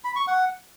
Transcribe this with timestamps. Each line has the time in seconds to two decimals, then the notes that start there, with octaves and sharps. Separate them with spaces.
0.04 B5
0.16 C#6
0.27 F#5